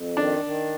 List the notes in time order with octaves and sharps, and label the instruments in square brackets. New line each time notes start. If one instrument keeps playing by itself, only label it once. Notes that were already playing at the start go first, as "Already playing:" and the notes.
Already playing: [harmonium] F2
[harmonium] D#3 [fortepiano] D4
[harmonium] D#3